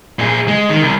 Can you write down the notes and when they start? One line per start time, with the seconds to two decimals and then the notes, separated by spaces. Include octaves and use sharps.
0.19 A#2 G#4
0.48 G#3
0.69 D#3
0.82 C2